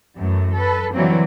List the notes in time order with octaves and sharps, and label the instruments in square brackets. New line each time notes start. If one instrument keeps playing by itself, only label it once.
[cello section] F#2 E3 A3
A4 B4
D3 E3 F#3 G3 A#3 C4